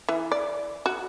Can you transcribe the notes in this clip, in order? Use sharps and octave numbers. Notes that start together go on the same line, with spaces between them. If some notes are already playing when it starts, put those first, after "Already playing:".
E3
D5
F#4